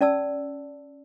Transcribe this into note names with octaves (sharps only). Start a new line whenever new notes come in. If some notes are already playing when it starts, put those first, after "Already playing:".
C#4 D5 A5 E6